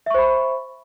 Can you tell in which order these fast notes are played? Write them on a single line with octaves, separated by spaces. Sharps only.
E5 C#6 C5 B5